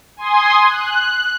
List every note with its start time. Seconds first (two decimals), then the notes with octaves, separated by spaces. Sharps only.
0.17 G#5 C6 D#6
0.65 F#6